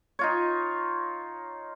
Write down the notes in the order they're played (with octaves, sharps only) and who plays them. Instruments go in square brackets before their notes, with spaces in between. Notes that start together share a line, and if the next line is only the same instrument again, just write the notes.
[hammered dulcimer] D#4 F4 C#5